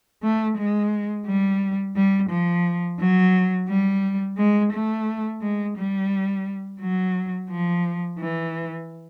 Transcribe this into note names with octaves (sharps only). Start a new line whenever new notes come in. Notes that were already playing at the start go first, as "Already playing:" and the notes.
A3
G#3
G3
G3
F3
F#3
G3
G#3
A3
G#3
G3
F#3
F3
E3